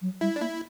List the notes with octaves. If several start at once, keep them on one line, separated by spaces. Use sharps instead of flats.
F#3
G3 E4
D4
A#3 E4